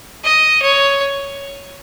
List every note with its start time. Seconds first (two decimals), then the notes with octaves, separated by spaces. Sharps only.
0.24 D#5
0.62 C#5